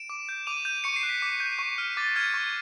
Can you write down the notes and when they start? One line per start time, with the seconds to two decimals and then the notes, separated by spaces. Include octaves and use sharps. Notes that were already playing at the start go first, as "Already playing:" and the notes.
Already playing: D7 E7
0.09 D6
0.29 G6
0.47 D6 D#7 F7
0.65 G6 D#7 F7
0.84 C#6 C#7 D#7
0.96 C7
1.03 F#6
1.09 B6
1.22 D6 C7
1.40 G6
1.59 C#6
1.78 F6
1.97 D6 A6
2.16 F6 G#6
2.34 C#6